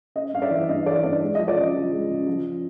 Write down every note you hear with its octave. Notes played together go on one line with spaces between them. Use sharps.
C#4 D#5
G2 F5
D5 E5
E3
G2 D#5
E3 D5
G2 D5
G#3 D5
F3 D#5
D5
C#3 D#5
F3
G#3
C#3
F3
C#3